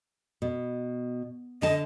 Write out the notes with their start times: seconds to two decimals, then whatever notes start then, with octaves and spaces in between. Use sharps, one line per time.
0.42 B2
1.62 D3 D#5 A5